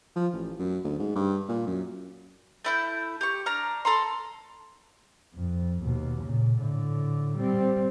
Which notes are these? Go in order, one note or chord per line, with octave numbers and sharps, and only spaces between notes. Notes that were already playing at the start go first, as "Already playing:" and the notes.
F3
A1
F#2
D2
G#2
G2
A#2
F#2
A3 E4 G6
G4 C#6
D4 A#5 F6
A4 A#5 C6
F2
D#2 B2
A#2 C#3
A2 D3
G3 C4